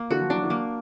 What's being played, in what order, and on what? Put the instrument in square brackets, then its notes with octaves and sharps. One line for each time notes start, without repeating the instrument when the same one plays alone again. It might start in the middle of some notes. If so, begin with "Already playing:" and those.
Already playing: [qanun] A#3
[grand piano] D3 E3 [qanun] F#4
[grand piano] F3
[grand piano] E3 F#3 [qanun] D4
[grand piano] E3 F#3
[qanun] A#3